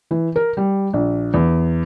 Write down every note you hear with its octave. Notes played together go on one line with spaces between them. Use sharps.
E3
A#4
G3
A#1
E2